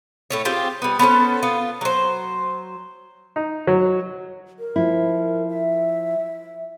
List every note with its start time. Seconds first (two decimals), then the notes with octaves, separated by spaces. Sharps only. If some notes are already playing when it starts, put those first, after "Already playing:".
0.30 A2 A3 C#5
0.45 C4 F4 G4 G#4
0.82 G3 B3
0.99 B3 C#4 A4 C5
1.43 B3 F4
1.81 F#3 C5
3.36 D#4
3.67 F#3
4.59 A#4
4.76 F3 E4
5.48 E5